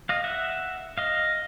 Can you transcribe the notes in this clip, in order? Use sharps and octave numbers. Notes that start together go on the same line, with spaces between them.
D#5 F5
E5 F#5
D#5 F5